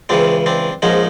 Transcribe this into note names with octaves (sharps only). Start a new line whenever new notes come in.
C#2 C#3 E3 C4 D4
C4 D4
A#1 G#2 F3 C#4 D#4